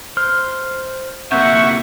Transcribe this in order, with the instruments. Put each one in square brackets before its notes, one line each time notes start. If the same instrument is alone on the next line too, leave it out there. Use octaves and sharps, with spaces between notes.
[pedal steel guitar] C5 F6
[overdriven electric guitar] C3 A#3 [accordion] E5 F#5 C#6 [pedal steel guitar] G6